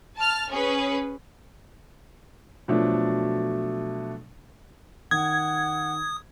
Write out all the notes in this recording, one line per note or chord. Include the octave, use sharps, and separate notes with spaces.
A5 F6
C#4 G#4 B4
B2 F3 F#3 A3 D4 A4
D#3 F#5 D#6 G#6